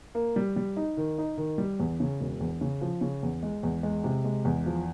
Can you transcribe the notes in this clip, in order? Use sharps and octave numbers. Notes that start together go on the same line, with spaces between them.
A#3
G3
G3
D#4
D#3
D#4
D#3
G3
E2
C#3
E1
E2
C#3
F3
C#3
E2
G#3
E2
G#3
C3
G#3
E2
F3